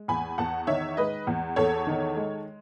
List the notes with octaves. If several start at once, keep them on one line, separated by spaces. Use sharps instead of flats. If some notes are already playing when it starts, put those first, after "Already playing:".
Already playing: G#3
E2 G#5 B5
E2 F#5 A5
D#3 C#5 E5
G#3 B4 D#5
E2
E2 A4 C#5
D#3
G#3